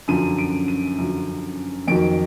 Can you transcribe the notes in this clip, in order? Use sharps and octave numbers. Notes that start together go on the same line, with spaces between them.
F#2 D3 F3 D#7
D7
D#7
F#2 D3 F3
F2 D#3 F#3 D7